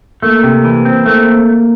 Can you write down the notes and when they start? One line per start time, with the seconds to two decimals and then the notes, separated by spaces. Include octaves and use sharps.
0.22 A3 A#3
0.44 C3
0.64 E3
0.85 C4
1.06 A3 A#3